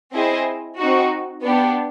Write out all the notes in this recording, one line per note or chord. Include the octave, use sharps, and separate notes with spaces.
C4 E4 G#4 C5 D#5
C4 D#4 F#4
B3 D4 G4